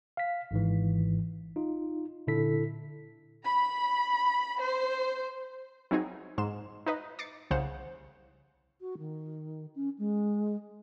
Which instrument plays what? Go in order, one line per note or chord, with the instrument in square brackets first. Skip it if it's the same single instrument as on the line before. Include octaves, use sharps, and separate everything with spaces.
[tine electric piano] F5 B6
G#1 G#2 E3
D#4 F4
A#2 D3 E4 A4 B6
[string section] B5
C5
[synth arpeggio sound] F#3 C4 D#4 G#4
G#2 C6 E7
D#4 B4 D#5
D6 A6 C7 C#7
C2 C#3 C5 F#5 E7
[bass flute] F#4
D#3
C#4
G#3